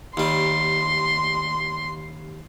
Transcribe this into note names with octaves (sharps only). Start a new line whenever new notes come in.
D#2 G3 C6